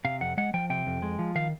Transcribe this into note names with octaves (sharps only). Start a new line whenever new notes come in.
C3 F5
F2 F#5
G#3 F#5
F3 G5
C3 G5
F2
G#3
F3
D#3 F5